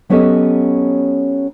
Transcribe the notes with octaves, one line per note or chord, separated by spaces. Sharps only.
F#3 B3 C#4 G4 A4 D#5